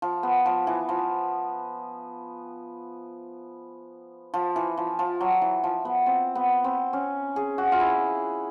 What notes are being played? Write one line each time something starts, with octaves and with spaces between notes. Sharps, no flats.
F3
B3
F3
E3
F3
F3
E3
F3
F3
F#3
E3
F3
B3
C4
B3
C4
C#4
G#4
F#4
F4
E4